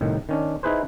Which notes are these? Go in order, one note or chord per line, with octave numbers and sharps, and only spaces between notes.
C2 A2 D#3
D#3 C#4 D4
D#4 E4 G#4 B4 C5